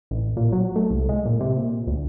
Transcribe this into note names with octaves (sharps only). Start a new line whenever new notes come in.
A1
A#2
F#3
A3
C2
G#3
A#2
C3
A#2
D2